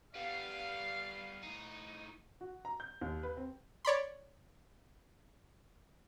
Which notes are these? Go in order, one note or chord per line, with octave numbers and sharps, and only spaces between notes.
G3 B3 F5
A2 D#4
F#4
A#5
G6
D#2
B4
C4
C#5 D5 B5 C6